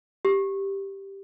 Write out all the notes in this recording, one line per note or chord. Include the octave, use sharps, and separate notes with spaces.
G4